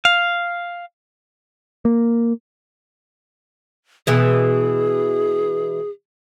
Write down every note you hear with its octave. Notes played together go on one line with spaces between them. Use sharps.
F5
A#3
B2 E3 G#3 G#4